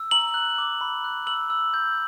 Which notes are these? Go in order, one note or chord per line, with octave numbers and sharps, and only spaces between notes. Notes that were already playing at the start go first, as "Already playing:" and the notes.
Already playing: E6
A#5 F#7
F#6
D6
B5
F#6
E6 F#7
E6
G6